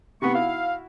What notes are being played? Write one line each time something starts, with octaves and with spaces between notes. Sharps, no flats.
C3 A3 B3 B5 C#6
E4 F#4 F5